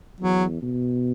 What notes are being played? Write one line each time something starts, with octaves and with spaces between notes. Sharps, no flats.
E2 F#3
B2